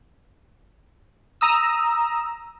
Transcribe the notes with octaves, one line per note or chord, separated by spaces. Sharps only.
A#5 D#6 E6